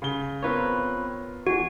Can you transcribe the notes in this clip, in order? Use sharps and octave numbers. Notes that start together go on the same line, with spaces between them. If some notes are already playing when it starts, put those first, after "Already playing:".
C#3 G7
B3 C4 F4 A#4 B4 C#5
E2 E3 F#4